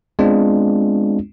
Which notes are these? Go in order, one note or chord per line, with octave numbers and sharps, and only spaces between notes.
G#3 B3 C4 D4 F4